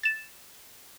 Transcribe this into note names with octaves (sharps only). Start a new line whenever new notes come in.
A6 E7